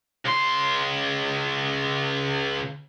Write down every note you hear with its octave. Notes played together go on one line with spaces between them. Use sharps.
C#2 C6